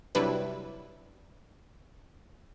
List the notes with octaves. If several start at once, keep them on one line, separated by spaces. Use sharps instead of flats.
C3 F#3 G3 D4 E4 B4